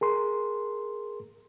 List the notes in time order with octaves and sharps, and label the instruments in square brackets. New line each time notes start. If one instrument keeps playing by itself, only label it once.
[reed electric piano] G#4 A#4 C6